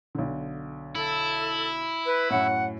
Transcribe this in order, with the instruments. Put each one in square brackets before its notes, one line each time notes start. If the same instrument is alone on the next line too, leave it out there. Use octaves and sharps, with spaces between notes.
[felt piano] B1 D3
[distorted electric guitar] E4 [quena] A4
[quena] B4
[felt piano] F#2 A2 [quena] F#5